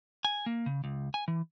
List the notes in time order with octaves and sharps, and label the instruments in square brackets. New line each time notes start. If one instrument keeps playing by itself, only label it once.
[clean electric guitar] G#5
A#3
C#3
C#2
G#5
E3